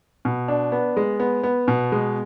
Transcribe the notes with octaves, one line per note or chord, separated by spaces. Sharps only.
B2
D4
B3
G#3
B3
B3
B2
G#3